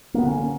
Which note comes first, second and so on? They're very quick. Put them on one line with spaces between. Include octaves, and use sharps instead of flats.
A#3 B3 D3 C#4